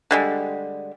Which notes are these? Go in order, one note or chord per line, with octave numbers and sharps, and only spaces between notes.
D3 G3 G#3